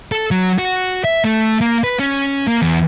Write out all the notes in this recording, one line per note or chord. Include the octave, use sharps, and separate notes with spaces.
A4
F#3
F#4
E5
A3
A#3
B4
C#4
A#3
E2